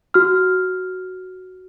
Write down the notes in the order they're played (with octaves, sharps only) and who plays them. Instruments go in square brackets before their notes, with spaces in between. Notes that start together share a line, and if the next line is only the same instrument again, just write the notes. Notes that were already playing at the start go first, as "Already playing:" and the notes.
[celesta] F#4 F6